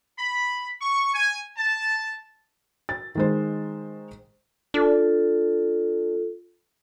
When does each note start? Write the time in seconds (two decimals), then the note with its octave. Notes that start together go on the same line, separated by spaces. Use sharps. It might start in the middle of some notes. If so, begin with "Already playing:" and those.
0.17 B5
0.81 C#6
1.14 G#5
1.57 A5
2.89 A6
3.15 D#3 G#3 C5
4.74 D4 F4 A4